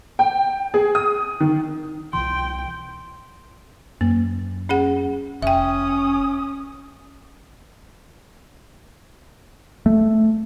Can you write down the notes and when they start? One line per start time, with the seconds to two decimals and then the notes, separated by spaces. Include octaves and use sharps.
0.19 G5
0.74 G#4
0.95 D#6
1.40 D#3
2.13 C2 B2 E3 G5 C6
4.01 F#2 A#3
4.69 C#4 G#4 F#5
5.42 F1 C#4 E5 G5 D#6
9.86 A3